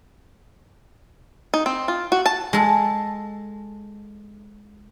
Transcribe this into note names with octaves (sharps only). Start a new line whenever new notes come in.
D#4
C4
F4
F#4
A5
G#3 A4